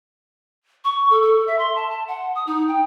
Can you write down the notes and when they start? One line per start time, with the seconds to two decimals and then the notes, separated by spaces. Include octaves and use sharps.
0.85 C#6
1.10 A4
1.22 A4
1.47 E5
1.59 C6
1.76 A5
1.90 A5
2.08 F#5
2.35 D#6
2.47 D#4
2.68 G5